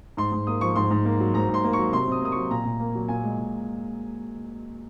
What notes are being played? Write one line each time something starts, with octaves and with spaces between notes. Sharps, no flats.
G#2 C6
G#2
A#3 D#6
F3 C#6
G#2 C6
G#2
A#3
F#3
G#2 A#5
G#2
C6
A#3
C#6
F#3
C3 C6
C3 D#6
A#3 D#6
F#3 C#6
A#2 A#5
A#2
A#3
F#3
A#2 G#5
G#3
A#2